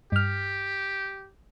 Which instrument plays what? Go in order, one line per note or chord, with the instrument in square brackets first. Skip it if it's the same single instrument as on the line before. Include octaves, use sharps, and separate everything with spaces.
[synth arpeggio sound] G2 F6 [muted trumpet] G4